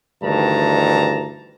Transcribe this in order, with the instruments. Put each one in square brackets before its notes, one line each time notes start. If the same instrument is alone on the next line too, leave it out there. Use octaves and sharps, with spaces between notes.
[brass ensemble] D2 G2 D#3 E3 A5 A#5